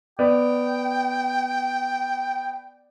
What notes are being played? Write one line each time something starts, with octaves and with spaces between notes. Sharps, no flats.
B3 D5 G5